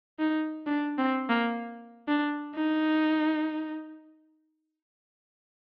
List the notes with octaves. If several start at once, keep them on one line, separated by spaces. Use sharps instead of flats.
D#4
D4
C4
A#3
D4
D#4